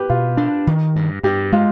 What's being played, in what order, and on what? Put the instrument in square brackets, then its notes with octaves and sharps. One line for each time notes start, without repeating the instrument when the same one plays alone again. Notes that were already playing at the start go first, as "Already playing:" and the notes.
Already playing: [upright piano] G4 B4
[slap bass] B2 [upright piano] F4
[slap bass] D4
D#3
G2
[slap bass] G2 [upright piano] G4
[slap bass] G#3 [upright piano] F4